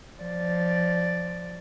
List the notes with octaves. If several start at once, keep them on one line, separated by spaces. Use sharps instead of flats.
F3 D5